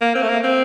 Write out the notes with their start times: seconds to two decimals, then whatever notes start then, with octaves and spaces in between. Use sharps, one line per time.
0.01 A#3
0.15 C4
0.22 A3
0.29 A#3
0.44 C4